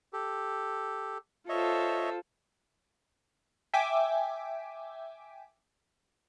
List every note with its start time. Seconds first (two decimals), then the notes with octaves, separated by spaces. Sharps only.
0.13 G4 A4
1.49 F4 A4 C5 C#5 D#5 E5
3.74 E5 G5 G#5 D6